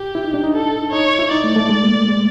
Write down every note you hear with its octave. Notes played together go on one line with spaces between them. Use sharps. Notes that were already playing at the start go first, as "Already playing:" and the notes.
Already playing: G4
E4
D#4
D4
D#4
A4
D#4 C#5
E4
D#4 D5
A3
A3
G#3
A#3
A3
G#3